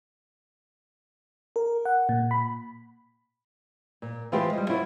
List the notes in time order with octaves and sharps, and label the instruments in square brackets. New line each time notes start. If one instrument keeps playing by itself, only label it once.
[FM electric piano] A#4
F#5
A#2
B5
[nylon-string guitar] A#2
E3 G#3 F4 G4 B4 C5
G3 D#5
F#3 E4 F4 A#4 B4